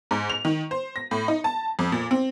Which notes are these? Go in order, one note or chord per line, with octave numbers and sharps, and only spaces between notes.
G#2
F7
D#3
C5
A#6
A2
D#4
A5
F2
A#2
C4